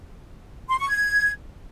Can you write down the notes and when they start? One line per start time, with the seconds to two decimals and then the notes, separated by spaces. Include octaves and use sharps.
0.69 C6
0.79 C#6
0.88 G#6